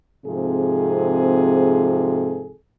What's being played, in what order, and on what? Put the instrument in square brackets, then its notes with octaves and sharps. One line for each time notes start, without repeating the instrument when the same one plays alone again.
[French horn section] G#2 C3 F3 C4 G#4 A4